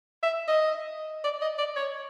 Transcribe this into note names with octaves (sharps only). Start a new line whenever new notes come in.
E5
D#5
D5
D#5
D5
C#5